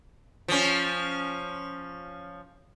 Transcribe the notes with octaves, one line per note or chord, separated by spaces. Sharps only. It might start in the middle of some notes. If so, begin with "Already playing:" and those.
F3 C#4